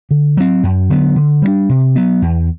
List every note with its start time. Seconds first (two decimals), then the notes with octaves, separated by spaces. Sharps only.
0.11 D3
0.37 F#3 C4
0.63 F#2
0.90 D3 F#3 B3
1.16 D3
1.42 G3 B3
1.47 D4
1.69 C3
1.96 F#3 B3
2.22 E2